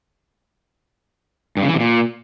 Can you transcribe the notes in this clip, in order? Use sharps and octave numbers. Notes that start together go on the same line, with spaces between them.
G2
C#3
E3
C3
A#2